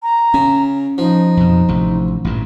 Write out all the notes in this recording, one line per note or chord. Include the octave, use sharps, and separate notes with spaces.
A#5
C#3 C#4
F3 D#4
F2 B2
A1 C3
A1 G2 A#2